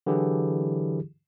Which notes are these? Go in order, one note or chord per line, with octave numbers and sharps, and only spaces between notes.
D3 E3 F#3 E4 G4 G#4